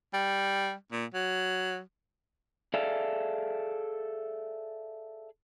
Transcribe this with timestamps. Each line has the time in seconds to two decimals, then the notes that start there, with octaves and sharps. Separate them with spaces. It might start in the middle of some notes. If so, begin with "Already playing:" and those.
0.14 G3
0.92 A#2
1.14 F#3
2.74 G#4 A4 D5 E5 F5